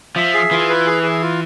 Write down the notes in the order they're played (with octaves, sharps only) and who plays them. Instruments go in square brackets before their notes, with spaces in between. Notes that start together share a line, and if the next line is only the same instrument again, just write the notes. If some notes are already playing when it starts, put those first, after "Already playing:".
[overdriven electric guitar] F3 [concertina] E5
[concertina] G#4
[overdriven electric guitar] E3 [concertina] F4
[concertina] B4
G#4
G#4
F4